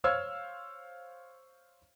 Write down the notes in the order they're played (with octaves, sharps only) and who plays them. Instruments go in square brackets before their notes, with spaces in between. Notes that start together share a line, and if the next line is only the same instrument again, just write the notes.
[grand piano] C5 C#5 F5 E6 F6 G#6